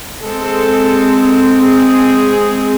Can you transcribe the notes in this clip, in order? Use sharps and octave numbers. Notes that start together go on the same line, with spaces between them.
G#3 C4 A4
G#4